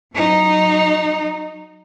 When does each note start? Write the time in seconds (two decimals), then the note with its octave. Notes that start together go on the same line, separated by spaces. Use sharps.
0.15 F#3 D#4